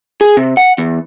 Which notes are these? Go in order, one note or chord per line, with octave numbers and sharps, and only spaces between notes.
G#4
C3
F#5
E2